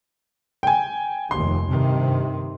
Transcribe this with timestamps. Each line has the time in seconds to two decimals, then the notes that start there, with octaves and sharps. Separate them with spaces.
0.63 G5 G#5
1.31 F1 D#2 C6
1.69 G2 C3 D#3